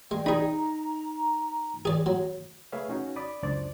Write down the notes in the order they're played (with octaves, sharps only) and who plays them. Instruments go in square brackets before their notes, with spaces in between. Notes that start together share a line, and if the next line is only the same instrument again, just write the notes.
[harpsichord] G#3 [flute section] D5 G5
[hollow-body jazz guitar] D#4 [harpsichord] G#4 B5
[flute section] A#5
[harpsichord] G#4 D5
F#3
[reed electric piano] A3 G#4 B4 C#5 E5 F5
C#4 D#4 F#4
D5 B5 D6 D#6
C#2 F#2 D4 C5 D5